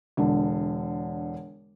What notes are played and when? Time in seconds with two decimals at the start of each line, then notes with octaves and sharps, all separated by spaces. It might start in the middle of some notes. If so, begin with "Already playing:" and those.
0.17 E1 D3